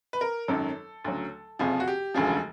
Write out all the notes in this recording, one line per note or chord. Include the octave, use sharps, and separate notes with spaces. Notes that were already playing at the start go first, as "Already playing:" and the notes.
B4
A#4
G#1 F#2 D#3 F#3 A4
D2 C#3 F#3
F#1 F2 C3 F3 G#4
F#4
G4
E1 D2 C#3 F3 G#4